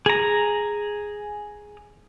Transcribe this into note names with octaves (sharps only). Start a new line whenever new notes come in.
G#4 A#5